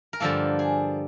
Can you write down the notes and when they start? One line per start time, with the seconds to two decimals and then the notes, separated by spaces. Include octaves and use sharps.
0.13 A#4
0.20 G2 D3 F3 A#3 A4
0.59 G#4